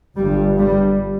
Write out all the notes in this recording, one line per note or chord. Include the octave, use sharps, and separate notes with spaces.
G1 G2 G3
G3